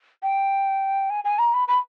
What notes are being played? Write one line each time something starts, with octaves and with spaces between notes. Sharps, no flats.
G5
G#5
G#5
A#5
B5
B5